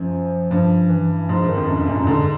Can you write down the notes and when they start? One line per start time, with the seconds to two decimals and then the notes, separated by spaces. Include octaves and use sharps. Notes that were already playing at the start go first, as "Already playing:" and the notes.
Already playing: F#2 F3
0.51 G2 F3
0.89 E3
1.29 G#2 F3
1.42 G2
1.48 D#3
1.55 F2
1.68 F#2
1.77 G2
1.87 F#2 A#2
1.98 G2
2.07 G#2 D3